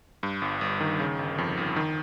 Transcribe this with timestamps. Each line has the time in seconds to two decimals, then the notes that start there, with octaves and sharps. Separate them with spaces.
0.23 G2
0.42 G1
0.61 G1
0.81 D#3
1.00 C#3
1.19 G1
1.38 F2
1.57 G1
1.76 D#3